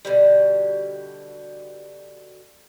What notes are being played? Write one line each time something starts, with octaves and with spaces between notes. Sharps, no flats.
B2 D3 G3